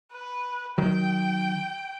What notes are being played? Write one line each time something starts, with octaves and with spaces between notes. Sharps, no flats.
B4
D#3 F#3 G5